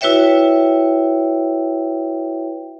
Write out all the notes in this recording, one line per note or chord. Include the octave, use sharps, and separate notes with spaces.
E4 F#4 B4 C#5 E5 G5